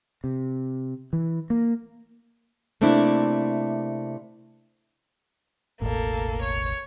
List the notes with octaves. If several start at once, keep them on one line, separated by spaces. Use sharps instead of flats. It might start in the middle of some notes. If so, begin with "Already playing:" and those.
C3
E3
A#3
C3 A3 A#3 C4 D4 E4
E1 A1 A2 A#3 A4
C#5